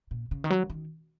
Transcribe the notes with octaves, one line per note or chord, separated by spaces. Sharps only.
A#2
C#3
D#3
F#3
D#3